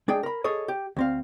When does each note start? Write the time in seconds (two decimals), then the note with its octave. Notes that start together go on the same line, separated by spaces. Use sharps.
0.08 G#3 D4 G#4 G5
0.23 A#4 B5
0.44 G#4 A4 C#5 D#5
0.68 G4
0.96 D2 C4 F5